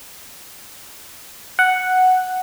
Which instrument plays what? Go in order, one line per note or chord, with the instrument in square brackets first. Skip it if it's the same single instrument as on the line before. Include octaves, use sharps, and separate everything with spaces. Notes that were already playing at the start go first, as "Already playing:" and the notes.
[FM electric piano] F#5